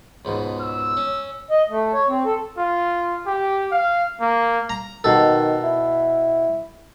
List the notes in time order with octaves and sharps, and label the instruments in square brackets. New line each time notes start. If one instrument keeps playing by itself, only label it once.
[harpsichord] C#2 G#2 B2
[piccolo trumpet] E6
[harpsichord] C#4
[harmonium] D#5
A3
C#5
C4
A4
[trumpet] F4
G4
F5
A#3
[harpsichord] A#5
[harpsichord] B2 A4 [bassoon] D#3
[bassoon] E4